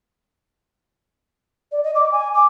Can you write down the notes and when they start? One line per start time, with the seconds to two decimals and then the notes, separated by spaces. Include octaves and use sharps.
1.71 D5
1.83 D#5
1.95 D6
2.11 G#5
2.34 D6